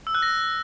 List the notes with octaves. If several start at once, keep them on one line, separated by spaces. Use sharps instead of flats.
E6
F#6
A#6